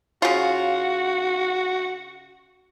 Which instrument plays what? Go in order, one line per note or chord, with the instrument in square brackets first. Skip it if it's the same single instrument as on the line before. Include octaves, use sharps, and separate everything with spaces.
[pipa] C#3 F4 [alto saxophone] F#4